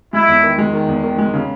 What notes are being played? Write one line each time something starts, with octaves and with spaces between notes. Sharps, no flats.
G#3 E4
E2
D#3
G#3
D#3
E2
D#3
G#3
C#3